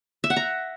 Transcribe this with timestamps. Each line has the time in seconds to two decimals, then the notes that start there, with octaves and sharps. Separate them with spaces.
0.24 E5
0.30 F#5
0.36 A#5